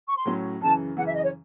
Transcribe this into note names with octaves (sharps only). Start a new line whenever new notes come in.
C#6
C6
A2 F#3 C#4
F#2 C#3 E3 A5
F#2 C#3 E3 F#5
E5
D#5
C#5